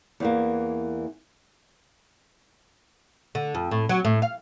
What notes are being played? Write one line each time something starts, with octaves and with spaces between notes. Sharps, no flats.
E2 E3 A#3
D3
F2
A2
F#3
A2
F5